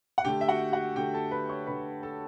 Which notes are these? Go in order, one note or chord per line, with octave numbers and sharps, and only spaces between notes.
F#5
D3 A3 G4 G5
E5
F#4 F#5
F#4 F#5
D3 A3 G4 G5
A4 A5
B4 B5
C#5 C#6
D3 A3 B4 B5
A4 A5